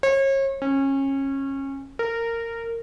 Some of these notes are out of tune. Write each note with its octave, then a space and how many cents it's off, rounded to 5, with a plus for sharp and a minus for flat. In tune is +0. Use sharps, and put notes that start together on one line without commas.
C#5 -35
C#4 -25
A#4 -15